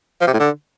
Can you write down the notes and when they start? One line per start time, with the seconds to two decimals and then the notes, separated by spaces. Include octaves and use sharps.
0.21 F3
0.27 C3
0.33 A2
0.40 D3